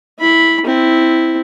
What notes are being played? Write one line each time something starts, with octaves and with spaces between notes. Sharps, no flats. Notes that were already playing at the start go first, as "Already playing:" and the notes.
E4 B5
C4 E4